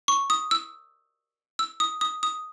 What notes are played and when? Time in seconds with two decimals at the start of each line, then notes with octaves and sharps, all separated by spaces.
0.08 C#6
0.30 D#6
0.51 E6
1.59 E6
1.80 D#6
2.01 D#6
2.23 D#6